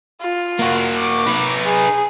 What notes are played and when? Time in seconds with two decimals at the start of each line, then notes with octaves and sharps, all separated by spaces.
0.21 F4
0.59 A#3 F#4
0.97 D6
1.27 D#4 B4
1.65 G#4